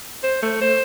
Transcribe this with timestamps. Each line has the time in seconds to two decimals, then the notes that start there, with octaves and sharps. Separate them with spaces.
0.23 C5
0.42 A3
0.61 C5